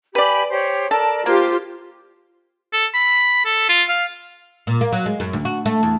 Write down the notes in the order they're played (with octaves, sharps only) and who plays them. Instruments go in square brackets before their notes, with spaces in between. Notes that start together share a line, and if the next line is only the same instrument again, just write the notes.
[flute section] G4 G#5 B5 [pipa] B4 D5
[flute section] G4 C5 C#5
[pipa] A4 [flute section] A#4 D5 A5
[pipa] A#3 [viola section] F4 G4 [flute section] C5
[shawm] A4
B5
A4
F4
F5
[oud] A#2
A#3
F#3
G#3
F#2
D2
F#4
A3
E2